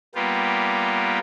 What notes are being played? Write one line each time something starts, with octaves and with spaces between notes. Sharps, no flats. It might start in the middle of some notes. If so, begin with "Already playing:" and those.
G3 A#3 B3 F4 G4